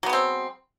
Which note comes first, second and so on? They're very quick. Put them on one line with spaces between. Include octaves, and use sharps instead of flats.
F#3 B3 G#3 C4